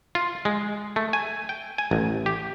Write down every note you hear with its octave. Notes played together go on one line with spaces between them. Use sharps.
F4
G#3
A3
G#5
G5
G#5
A1
G4